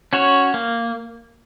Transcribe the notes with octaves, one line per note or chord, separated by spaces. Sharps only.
C#4 F#4 C#5
A#3